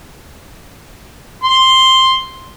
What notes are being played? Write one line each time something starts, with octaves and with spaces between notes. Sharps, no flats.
C6